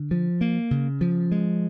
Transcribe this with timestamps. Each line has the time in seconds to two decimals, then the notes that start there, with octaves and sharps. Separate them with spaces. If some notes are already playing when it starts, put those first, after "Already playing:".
Already playing: D3
0.11 F3
0.41 A#3
0.71 C#3
1.01 F3
1.32 G#3